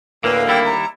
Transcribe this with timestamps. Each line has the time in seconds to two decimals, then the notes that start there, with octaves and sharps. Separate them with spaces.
0.24 D2 A2 D3 A#3 B4
0.48 D#2 G3 E4 G5
0.65 A#5